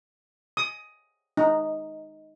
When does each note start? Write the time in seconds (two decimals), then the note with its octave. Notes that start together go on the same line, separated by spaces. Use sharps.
0.57 D#6
1.37 D#4